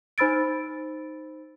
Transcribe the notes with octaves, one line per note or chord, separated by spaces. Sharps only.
D#4 C5 B5 E6 A6 D7